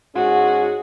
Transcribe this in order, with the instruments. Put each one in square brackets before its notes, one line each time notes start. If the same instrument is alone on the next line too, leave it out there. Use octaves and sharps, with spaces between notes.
[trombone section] G#2 C#4 G#4 [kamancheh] F#4